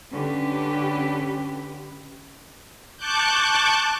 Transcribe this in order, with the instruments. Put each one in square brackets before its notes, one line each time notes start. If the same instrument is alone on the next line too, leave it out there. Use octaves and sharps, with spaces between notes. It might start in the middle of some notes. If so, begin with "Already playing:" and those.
[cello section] D3 C#4 G4 B4
[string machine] A5 C#6 D6 F#6 G6